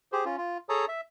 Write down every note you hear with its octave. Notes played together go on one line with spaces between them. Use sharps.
G4 G#4 C5
C#4 F4
F4
G#4 A4 C#5 A5 A#5 D#6
E5